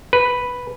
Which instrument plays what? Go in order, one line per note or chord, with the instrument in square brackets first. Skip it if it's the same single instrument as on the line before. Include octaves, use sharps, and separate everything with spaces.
[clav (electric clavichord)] B4